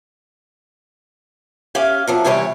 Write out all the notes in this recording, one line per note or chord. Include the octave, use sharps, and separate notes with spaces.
C#4 G4 F5
C3 F3 F#3
E2 C3 E3 G3 C#5